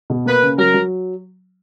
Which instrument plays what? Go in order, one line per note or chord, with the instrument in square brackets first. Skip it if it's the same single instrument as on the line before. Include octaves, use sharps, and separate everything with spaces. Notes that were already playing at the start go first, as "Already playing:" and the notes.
[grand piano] B2
[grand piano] A#3 [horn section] B4
[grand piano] C#3
[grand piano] F#3 [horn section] A#4
[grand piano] F#3